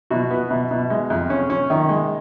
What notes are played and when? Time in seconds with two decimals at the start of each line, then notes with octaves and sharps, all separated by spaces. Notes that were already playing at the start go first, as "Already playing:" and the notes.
0.10 B2 F#4
0.31 B3
0.51 B2
0.71 B2
0.90 G#3
1.10 F2
1.30 C#4
1.50 C#4
1.70 D#3
1.89 G#3